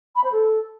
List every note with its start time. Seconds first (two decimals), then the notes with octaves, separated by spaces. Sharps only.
0.15 B5
0.24 C5
0.32 A4